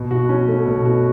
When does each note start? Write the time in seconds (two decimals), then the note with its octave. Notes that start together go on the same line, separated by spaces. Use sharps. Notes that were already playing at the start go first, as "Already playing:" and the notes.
Already playing: B2
0.11 F#4
0.29 C#4
0.48 A3
0.66 B2
0.85 F#4